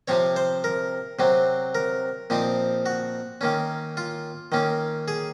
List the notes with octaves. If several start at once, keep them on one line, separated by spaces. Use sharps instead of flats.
C3 F3 C4 C#5
C5
A#4
C3 F#3 C4
A#4
A#2 F3 C4 D#4
F#4
D#3 A#3 C#4
F4
D#3 A#3 C#4
G#4